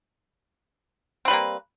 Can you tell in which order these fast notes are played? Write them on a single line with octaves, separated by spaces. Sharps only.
C4 B4 G3 A#3